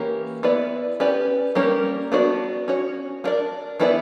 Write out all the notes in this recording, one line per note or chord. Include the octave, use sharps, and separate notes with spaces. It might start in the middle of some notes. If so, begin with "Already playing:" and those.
Already playing: E3 A#3 C#4 G4 A#4
B3 E4 B4 D5
C#4 G4 B4 D5
G3 A#3 C#4 G4 A#4
B3 D4 F#4 B4 D5
C#4 F#4 C#5
B3 D4 A#4 D5
E3 B3 E4 B4 D5